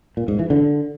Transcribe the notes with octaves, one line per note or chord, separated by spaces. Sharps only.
A#2
G#2
E3
D3